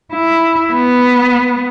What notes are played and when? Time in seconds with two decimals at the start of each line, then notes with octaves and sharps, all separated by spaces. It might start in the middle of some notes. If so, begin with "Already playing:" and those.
0.13 E4
0.74 B3